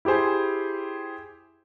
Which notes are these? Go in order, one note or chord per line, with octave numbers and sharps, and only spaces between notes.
E4 G4 G#4 C5 G#5